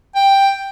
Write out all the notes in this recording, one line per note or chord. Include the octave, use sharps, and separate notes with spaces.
G5